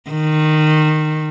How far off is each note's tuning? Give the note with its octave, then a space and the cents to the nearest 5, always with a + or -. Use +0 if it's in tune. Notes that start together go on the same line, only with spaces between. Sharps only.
D#3 -15